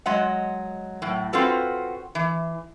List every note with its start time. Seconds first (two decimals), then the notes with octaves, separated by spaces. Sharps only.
0.06 F#3 G#3 D#5 F#5
1.02 A2 F#3
1.33 C4 F4 F#4 A4 B4
2.15 E3